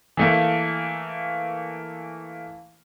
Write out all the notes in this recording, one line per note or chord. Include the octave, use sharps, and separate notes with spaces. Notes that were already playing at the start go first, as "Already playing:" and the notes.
E3 A3 A#3